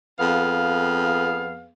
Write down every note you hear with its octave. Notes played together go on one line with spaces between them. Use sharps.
F2 B3 G#4 F5